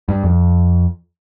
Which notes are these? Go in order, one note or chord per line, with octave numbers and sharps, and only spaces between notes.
G2
F2